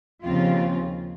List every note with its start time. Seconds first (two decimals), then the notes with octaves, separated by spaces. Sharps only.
0.23 D#2 C#3 F3 C4 F4